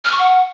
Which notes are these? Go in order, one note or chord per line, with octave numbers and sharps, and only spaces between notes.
F6
C#6
F#5